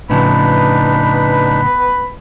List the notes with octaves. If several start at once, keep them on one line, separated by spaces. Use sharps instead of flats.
A2 C#3 F3 B3 D4 D#4 B4 B5